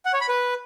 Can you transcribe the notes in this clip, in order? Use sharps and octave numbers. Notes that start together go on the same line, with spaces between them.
F#5
C#5
B5
B4